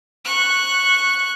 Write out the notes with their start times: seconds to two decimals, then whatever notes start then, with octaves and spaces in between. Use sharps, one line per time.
0.25 C#6 F#6